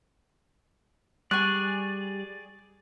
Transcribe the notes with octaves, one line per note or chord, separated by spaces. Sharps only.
G3 G#4 D5 G#5 C#6 F#6